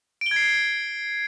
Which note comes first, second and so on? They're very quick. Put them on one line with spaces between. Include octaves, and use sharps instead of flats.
D7 G7 G#6 C7